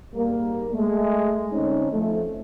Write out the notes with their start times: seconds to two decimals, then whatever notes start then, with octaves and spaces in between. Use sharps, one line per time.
0.15 G#2 G3 A#3
0.74 G#3 A3
1.52 D3 C4 C#4 D#4
1.91 F3 A3